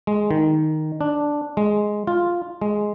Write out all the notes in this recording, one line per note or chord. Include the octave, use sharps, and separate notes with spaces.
G#3
D#3
D4
G#3
F4
G#3